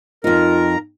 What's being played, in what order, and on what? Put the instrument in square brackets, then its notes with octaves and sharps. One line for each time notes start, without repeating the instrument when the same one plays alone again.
[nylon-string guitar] F2 D#4 [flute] F4 [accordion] A#4